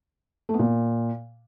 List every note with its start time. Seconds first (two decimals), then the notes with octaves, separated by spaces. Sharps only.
0.49 A3
0.54 B3
0.59 A#2